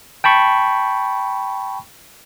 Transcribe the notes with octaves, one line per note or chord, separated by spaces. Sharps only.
G5 A5 B5 C#6